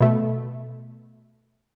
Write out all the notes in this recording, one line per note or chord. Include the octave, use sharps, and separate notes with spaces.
B2 A3